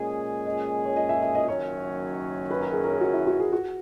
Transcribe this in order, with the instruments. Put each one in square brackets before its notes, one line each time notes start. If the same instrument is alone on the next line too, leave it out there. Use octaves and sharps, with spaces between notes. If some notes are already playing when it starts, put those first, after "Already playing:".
Already playing: [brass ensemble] A#2 G#3 C#4 G#4
[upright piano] D#5
C#5
D#5
E5
E5
D#5
[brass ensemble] F#1 F#2 D#3 F#3 C#4 [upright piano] C#5
[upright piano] B4
A#4
G#4
A#4
G#4
F#4
E4
F#4
G#4
F#4